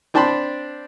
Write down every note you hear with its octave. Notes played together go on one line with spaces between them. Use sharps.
C4 D4 G5 A5 B5 C6